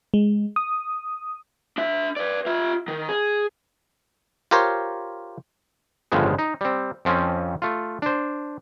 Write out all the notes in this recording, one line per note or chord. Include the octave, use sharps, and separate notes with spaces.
G#3
D#6
D4 E5
B4 D5
F4 E5
D#3
G#4
F4 G4 A#4 C5 C#5
G1 A2 C#3 F3 G#3 B3
D#4
G3 C4
F2 F3 C4 C#4
A3 F4
D4 C5